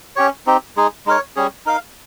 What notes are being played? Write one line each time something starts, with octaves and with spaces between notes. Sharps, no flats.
C#4 G4 C#5
C4 D#4 G4
G#3 D#4 G#4
G#3 D#4 A#4 C#5
G3 C#4 G#4
D#4 A#4 F5